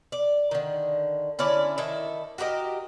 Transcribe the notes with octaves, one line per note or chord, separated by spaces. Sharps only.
D5
D3 D#3
D3 C#4 E4 D5
D#3 E4 A4 E5
F#4 G4 A#4 D#5